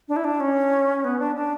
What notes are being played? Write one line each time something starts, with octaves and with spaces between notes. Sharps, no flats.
D4
E4
D4
C#4
B3
D4
D4